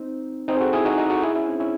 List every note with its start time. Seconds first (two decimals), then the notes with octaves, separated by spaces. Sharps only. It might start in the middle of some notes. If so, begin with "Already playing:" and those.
Already playing: C4 D#4
0.48 C4 D#4
0.57 G#4
0.61 F#4 A4
0.73 E4 G#4
0.85 D#4 F#4
0.98 D#4 F#4
1.10 F#4 A4
1.22 E4 G#4
1.35 C#4 E4
1.47 C4 D#4
1.60 C#4 E4